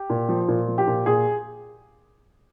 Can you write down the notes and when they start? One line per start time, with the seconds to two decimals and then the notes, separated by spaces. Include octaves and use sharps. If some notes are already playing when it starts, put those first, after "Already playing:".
Already playing: G4
0.10 A#2
0.29 F3
0.48 A#2
0.68 F3
0.78 G4
0.87 A#2
1.06 A#2 G#4